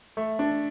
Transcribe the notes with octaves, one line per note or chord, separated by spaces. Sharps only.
A3
D4